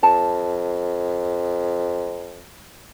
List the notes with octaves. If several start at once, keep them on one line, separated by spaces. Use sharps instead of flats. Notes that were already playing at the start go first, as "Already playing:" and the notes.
F2 A5